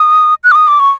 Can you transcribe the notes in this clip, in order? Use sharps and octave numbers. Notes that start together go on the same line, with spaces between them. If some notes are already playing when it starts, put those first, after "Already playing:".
Already playing: D#6
F#6
D6
D#6
D6
C#6